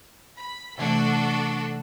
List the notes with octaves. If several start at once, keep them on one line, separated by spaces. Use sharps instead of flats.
B5
C3 E3 A3 D4 F#4 A4